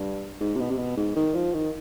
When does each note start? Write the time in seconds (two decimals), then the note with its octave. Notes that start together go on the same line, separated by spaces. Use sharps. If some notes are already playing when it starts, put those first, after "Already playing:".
Already playing: G2
0.40 G#2
0.55 C3
0.60 B2
0.71 C3
0.78 B2
0.97 G#2
1.16 D#3
1.35 F3
1.54 D#3